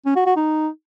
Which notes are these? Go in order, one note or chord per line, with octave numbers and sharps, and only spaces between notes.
C#4
F#4
F#4
D#4